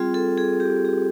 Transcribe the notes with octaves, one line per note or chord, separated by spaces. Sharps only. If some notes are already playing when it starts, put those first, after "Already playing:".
Already playing: G3 C4 F4 G#4
A4
G#4
G4
G4